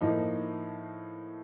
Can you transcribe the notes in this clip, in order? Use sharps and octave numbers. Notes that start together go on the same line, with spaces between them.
A2 F3 A#3 D#4